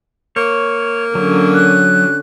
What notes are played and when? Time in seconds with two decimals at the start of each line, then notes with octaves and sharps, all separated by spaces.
0.36 A#3 C#5
1.15 D3 F#3 C#4 D4
1.54 F#6